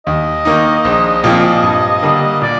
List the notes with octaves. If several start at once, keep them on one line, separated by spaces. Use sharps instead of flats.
D#2 D#5
D#3 A#3 D#4
A#1
A#2 F3 C4 F4
G2
D3 G3 A#3
A#2 D5